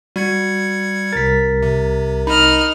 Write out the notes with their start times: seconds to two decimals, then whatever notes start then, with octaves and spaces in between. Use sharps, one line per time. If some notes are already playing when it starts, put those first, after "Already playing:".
0.16 G3 F#4 G#6 C#7
1.13 C2 A#4 A6 B6
1.63 C3
2.27 D#4 D#5 B5 F6